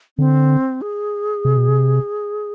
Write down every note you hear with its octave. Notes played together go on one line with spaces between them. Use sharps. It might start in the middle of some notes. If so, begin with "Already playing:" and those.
D3 C4
G#4
C3
B2
C3